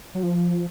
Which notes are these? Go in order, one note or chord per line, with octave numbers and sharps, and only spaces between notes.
F#3
F3